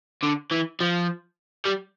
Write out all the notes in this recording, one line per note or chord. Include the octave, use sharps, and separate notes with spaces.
D3
E3
F3
G3